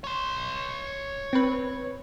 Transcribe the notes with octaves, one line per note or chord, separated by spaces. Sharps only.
C#5 C6
C4 B4